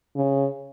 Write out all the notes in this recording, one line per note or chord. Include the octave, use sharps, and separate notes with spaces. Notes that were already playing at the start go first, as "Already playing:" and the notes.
C#3